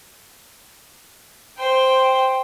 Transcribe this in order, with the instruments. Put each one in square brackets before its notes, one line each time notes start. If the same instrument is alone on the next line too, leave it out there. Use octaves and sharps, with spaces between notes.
[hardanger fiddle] C5 G5